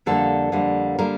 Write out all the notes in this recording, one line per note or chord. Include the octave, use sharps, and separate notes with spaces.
F2 D3 G3 A#3 A4
F2 D3 G3 A#3
D3 G3 A#3 A#4